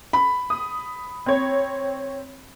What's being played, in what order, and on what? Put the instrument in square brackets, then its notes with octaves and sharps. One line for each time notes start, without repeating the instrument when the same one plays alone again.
[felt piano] B5
[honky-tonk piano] D#6
C4 C#5